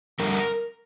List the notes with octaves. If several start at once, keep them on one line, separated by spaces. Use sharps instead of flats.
F2 D3 G3 A#4